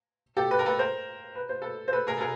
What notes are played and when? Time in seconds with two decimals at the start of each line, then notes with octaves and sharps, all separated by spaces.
0.37 G4 A4
0.51 B4
0.59 A#4
0.66 A4 B4
0.79 A#4 C5
1.36 B4
1.49 C5
1.62 A4 B4
1.88 C5
1.92 A4 B4
2.07 G#4 A#4
2.17 A4
2.21 G#4 A#4